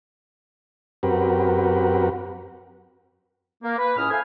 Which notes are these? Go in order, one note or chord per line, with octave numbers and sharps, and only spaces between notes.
F#2 C4 F#4 G4 A#4 B4
A#3
B4
C#2 A2 C#4 E4 D#6 F6
A4 C5 E5 F5 G#5